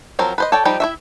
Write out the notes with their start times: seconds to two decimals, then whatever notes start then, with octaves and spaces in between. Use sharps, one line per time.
0.19 F3 F#3 C4 A#4
0.38 B4 C5 D#5
0.52 A4 C#5 D5 G5
0.65 F3 G3 D#4 G5 B5
0.80 E4 F#4 E5